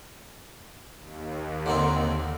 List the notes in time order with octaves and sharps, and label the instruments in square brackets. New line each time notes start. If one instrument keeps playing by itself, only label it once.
[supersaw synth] D#2
[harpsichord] D3 D#3 C4